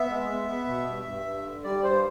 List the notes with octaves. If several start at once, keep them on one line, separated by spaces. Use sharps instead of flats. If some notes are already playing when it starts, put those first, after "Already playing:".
Already playing: B3 E5
G#3
B3
B3
B2
G2
G2
G2
D3
G3 D5
G2 C5